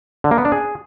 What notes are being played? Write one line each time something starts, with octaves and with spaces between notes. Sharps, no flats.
D3
A#3
B3
D4
G#4